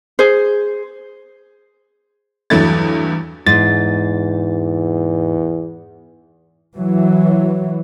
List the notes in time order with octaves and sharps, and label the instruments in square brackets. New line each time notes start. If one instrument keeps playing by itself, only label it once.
[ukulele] G#4 C5
[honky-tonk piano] E2 G2 F#3 A3 E4 A6
[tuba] E2 [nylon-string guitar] G#2 [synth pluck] A6
[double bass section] E3 F#3